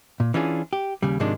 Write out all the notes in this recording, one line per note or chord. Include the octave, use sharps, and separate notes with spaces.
A#2
E3 C#4 D4 F4 G#4
G4
D#2 C#3 G3
G#2 C3 D#3 F3 G#3 D4